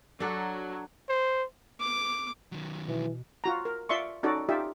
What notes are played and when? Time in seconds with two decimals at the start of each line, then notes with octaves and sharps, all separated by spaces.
0.20 F#3 D4 A4
1.09 C5
1.80 D6
2.52 D#3 F#3
2.88 B2 E3
3.44 F4 F#4 A#5
3.65 A#4
3.89 F4 D5 E5 C6 C#6
4.23 C#4 D#4 F#4 A4 D5
4.49 D#4 F4 G4 D5 E5